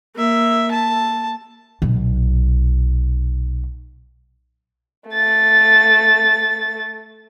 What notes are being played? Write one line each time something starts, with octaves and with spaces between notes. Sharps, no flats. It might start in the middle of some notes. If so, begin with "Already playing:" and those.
A#3 E5
A5
B1 A#2
A3 A6